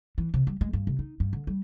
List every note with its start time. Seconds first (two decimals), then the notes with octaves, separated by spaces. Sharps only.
0.18 E3
0.34 C3
0.47 G3
0.61 G#3
0.73 G2
0.87 C3
0.99 D#4
1.20 G2
1.33 D3
1.47 G3